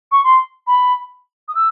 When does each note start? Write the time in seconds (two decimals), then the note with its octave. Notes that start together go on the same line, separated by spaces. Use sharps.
0.11 C#6
0.24 C6
0.67 B5
1.48 D#6
1.55 E6